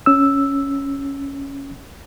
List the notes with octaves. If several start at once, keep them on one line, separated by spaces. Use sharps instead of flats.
C#4 E6